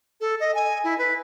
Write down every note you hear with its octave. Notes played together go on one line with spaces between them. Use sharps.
A4
D#5
G#5
E4
B4